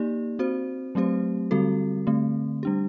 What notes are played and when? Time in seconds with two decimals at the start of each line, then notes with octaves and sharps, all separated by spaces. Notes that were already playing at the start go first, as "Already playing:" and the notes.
Already playing: A#3 D#4 G4 D5
0.39 C4 F#4 C5
0.95 F#3 A3 C4 G4 C5
1.51 D3 G3 C4 F#4 A4
2.07 D3 A3 C4
2.63 G3 D4 G4